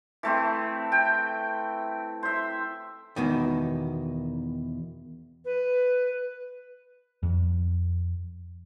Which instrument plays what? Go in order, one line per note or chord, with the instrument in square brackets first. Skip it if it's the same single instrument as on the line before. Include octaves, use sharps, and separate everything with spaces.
[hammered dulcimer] E3 A3 C4
G5
C5 E5
[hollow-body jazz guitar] E2 B2 D#3
[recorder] B4
[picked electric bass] F2